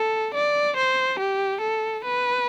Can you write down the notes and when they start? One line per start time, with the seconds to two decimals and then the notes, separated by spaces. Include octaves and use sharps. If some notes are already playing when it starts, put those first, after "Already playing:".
Already playing: A4
0.34 D5
0.76 C5
1.19 G4
1.61 A4
2.05 B4